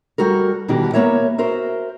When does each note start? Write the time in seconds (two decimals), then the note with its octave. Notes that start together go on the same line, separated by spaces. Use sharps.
0.18 G3 F#4 A4 A#4
0.68 B2 D#3 E3 G3 F#4 G4
0.93 A#3 B3 A#4 C#5 E5
1.38 F#4 A#4 C5 E5